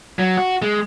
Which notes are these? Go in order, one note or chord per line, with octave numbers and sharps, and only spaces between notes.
F#3
F#4
G#3